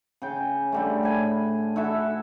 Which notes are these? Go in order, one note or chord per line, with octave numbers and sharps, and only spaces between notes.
C#3 G5
D3 G3 A3
A2 G#5 B5
E4 F#4 A4 E5